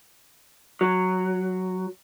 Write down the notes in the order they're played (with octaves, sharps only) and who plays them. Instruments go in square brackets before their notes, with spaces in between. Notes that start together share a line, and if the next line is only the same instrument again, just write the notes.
[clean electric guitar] F#3